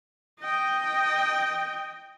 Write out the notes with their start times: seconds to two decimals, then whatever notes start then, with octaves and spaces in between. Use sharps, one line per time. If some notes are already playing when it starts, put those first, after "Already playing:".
0.41 D#5 G5